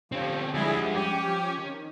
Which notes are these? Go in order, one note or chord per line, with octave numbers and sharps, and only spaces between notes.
D3 F3 C4 C#4 G4
F3 G3 G#3 D4 E4 F#4 G#4
C#4 G4
F3
D#3